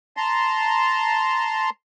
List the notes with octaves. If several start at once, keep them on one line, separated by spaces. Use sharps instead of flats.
A5 A#5 C6